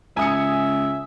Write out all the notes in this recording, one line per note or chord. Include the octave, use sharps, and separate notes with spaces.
C#2 E5 G#5 D#6 C#7